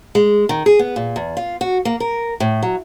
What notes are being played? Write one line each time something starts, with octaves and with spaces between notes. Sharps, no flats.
G#3
D#3
G#4
B3
A#2
E2
F4
F#4
A#3
A#4
A2
F#3